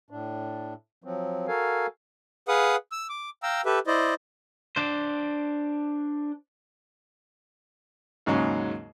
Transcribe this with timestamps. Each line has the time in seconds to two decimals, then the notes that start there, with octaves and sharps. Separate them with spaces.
0.10 A2 D4
1.04 F3 F#3 C4
1.48 F#4 A4 A#4 F5 G#5
2.48 G#4 B4 F5 F#5 D#6
2.92 E6
3.09 D6
3.43 F5 G5 A#5 E6
3.65 G4 A4 B4 E5
3.87 E4 C5 D5 D#5
4.76 D4 C5
8.26 D#2 G#2 C#3 F#3 G#3 C#4